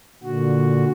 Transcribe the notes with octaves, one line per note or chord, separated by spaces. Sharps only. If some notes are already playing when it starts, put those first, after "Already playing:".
A#2 D3 F#4